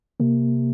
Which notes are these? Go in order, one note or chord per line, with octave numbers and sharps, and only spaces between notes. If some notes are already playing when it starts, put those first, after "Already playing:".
C3 A#3